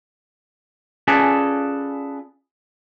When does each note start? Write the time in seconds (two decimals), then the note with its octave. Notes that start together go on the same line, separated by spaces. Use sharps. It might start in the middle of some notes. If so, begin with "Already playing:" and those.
1.08 C#4 F4 G#4 A4 B4 D5